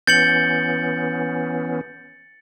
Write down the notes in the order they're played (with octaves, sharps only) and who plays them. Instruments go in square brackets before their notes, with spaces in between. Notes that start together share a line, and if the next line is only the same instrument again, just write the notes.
[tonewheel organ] E3 B3 C#4 [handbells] G6 [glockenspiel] A6 C#7 F#7